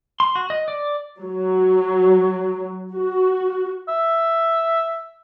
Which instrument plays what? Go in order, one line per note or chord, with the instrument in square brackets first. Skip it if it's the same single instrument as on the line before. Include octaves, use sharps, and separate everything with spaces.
[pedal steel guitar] C6
F#4
D#5
D5
[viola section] F#3
F#4
[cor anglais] E5